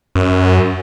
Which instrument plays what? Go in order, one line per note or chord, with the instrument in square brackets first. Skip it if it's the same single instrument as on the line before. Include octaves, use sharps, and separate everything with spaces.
[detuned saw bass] F#2